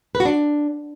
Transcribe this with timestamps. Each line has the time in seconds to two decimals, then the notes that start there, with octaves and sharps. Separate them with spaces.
0.15 B4
0.20 F#4
0.25 D4